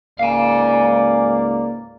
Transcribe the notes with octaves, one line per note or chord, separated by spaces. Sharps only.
C#2 G#2 A#3 D5 F5 G#5